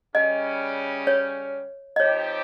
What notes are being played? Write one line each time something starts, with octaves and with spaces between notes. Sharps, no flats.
C#3 G3 C#4 D#5
C#5
D#5
F3 C4 D#4 G4 C#5